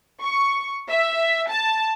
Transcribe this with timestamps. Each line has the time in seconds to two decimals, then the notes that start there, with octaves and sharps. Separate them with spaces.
0.23 C#6
0.89 E5
1.51 A5